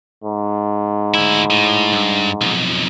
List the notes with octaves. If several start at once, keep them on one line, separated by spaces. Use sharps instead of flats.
G#2
D2 E4
A2
G2
B1 F2